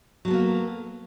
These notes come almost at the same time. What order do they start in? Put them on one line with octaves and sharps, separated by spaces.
F#3 A4 B3 A#3